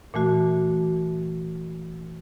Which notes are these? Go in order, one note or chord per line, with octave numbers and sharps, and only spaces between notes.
A#2 E3 A3 F#4